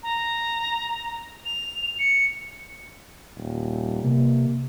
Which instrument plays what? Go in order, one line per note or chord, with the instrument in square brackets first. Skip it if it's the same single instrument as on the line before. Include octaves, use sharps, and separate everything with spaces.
[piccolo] A#5
F7
C#7
[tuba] D#1
[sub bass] C3 [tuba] A#3